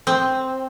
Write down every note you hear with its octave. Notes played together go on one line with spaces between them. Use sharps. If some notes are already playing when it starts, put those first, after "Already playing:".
C4